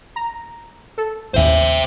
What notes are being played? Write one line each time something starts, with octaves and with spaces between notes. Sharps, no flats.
A#5
A4
A1 D#2 C5 E5